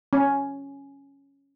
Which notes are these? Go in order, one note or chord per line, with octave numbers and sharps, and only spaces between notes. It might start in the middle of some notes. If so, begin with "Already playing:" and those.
C#4